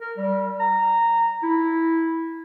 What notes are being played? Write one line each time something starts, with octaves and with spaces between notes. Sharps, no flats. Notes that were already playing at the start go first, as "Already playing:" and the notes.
A#4
G3
A#5
E4